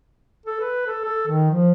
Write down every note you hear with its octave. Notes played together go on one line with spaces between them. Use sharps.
A4
B4
A4
A4
D#3
F3